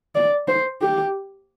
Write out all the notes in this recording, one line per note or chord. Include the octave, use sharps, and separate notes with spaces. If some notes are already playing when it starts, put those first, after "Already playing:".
D5
C5
G4